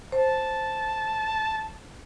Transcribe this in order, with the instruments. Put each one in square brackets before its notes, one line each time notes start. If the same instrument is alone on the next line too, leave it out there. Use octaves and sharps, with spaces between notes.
[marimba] C5 [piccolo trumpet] A5